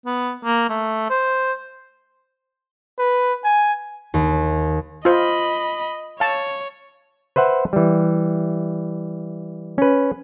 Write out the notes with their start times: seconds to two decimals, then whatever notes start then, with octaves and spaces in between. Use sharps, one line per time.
0.06 B3
0.45 A#3
0.69 A3
1.10 C5
2.99 B4
3.44 G#5
4.14 D#2
5.05 F4 C5 D#5 B5
6.20 C#5 F5 A5
7.36 B4 C5 E5 F#5
7.73 E3 G3
9.78 C#4 B4